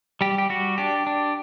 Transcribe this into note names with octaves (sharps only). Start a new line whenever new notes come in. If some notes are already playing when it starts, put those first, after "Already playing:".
G3 G4
G4
G3 F#4
D4 G4
D4